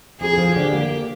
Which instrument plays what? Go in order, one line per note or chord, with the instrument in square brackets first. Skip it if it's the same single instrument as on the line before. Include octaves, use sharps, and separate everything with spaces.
[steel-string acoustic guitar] F2 [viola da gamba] G#4
[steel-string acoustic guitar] F3
[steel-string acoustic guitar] D3 [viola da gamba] G4
[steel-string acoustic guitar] A#3